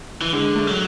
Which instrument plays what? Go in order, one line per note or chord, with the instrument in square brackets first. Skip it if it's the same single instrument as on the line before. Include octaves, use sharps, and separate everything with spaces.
[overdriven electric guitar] E3
[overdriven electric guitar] D3 [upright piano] G#3
[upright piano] A3
[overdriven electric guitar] F#3